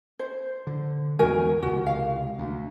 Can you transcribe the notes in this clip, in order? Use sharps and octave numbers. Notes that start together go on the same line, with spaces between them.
C5
D3
E2 D#3 G#3 F#4 A#4 G#5
C#2 C3 F#4
F5
D2